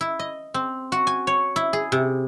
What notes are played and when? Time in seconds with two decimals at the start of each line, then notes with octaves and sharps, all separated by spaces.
0.01 E4
0.19 D#5
0.54 C4
0.92 F#4
1.07 G#5
1.27 C#5
1.56 E4
1.73 G#4
1.92 C3